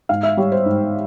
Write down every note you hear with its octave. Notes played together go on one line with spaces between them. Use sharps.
G#2 F5
E5
G3 C#5
C5
G#2